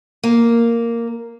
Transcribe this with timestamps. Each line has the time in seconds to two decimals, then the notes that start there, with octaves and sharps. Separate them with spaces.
0.24 A#3